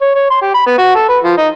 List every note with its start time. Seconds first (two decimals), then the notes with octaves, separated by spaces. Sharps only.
0.01 C#5
0.15 C#5
0.30 C6
0.42 G4
0.54 B5
0.66 B3
0.78 F#4
0.95 A4
1.09 B4
1.23 F3
1.37 D#4